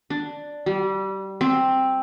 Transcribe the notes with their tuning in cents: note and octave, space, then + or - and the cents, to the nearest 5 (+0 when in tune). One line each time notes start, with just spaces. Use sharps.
D4 +5
G3 -25
C4 +5